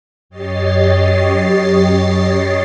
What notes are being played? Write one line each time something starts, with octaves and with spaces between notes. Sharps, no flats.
F#2 G4 C#5 D#5 A6 C7